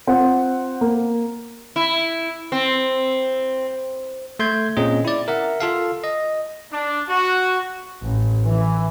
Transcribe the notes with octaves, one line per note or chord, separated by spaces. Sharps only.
C4 F4 F#5
A#3
E4
C4
A3 C6 G6 G#6
A#2 C4 C#4 G#4 D#5
E4 D5
A#4 E5 F#5
F4 A4 F5
D#5
D4
F#4
A1
E3